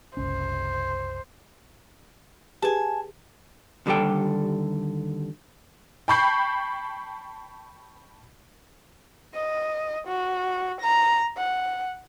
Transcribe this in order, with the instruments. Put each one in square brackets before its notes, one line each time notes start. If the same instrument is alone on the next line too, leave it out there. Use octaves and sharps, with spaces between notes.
[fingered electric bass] F#1 C2 C#4 [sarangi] C5
[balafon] G4 G#4 B4 [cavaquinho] G#5 A5
[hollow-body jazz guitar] D#2 D3 G3 G4 A4 G5
[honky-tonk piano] G5 A5 B5 C#6 G6 C7
[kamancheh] D#5
F#4
A#5
F#5